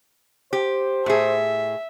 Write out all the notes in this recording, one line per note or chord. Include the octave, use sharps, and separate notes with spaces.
G4 C5
A2 G#4 E5